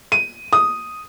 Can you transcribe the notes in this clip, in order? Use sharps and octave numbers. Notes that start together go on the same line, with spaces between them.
D#7
D#6